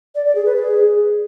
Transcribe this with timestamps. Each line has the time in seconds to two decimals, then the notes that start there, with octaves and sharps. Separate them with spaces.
0.15 D5
0.25 D5
0.35 G#4
0.45 B4
0.56 G#4